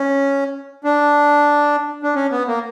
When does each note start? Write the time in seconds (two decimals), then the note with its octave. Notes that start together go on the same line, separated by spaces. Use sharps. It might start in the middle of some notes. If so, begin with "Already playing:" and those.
Already playing: C#4
0.84 D4
2.03 D4
2.15 C#4
2.32 B3
2.48 A#3